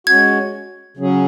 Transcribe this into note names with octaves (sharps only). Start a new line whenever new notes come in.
G#3 C#4 F#4 G#6
C#3 F#3 C#4 G#4